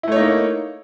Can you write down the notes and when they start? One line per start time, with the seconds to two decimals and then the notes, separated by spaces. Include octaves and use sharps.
0.03 E4
0.08 A3
0.12 C#5
0.16 D#4
0.20 A#3